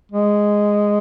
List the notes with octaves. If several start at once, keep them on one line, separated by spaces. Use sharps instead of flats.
G#3